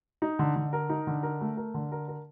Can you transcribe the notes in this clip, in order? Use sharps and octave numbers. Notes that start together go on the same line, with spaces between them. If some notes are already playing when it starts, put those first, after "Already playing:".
D#4
D3
D3
A#4
D#4
D3
A#4
A3
A#4
D3
A#4
A#4